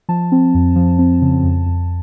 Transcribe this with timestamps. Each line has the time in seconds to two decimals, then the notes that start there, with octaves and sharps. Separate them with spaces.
0.09 F3 A5
0.32 C4
0.54 F2
0.76 F3
0.99 C4
1.22 C#3
1.44 F2
1.66 F2